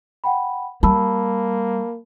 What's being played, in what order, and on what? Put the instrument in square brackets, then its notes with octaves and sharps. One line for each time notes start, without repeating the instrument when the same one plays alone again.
[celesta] F#5 G5 B5
[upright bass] G3 [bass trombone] A#3 [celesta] A5 B5 E6